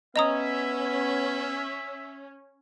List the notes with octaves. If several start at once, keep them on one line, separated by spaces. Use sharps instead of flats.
B3 C#4 C#5 D#5 E5 A#5 D#6